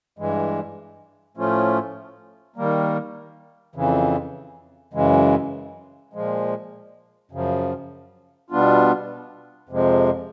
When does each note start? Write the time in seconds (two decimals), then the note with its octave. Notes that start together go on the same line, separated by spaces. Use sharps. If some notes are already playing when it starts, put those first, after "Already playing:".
0.19 G2 E3 G#3
1.37 A2 F3 A3 C#4 F4
2.56 D#3 G3 A#3
3.75 F2 C#3 E3
4.93 F#2 C#3 E3 G#3
6.13 A#2 F3 G#3
7.31 F#2 C#3 F3
8.50 B2 G3 B3 D4 F4
9.69 F2 C3 F3 G#3